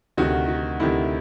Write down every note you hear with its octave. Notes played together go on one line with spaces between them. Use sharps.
D2 C3 D#3 F#4
F#4
D2 C3 D#3 E4